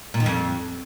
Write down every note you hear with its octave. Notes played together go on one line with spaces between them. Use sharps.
A#2
D#3
F2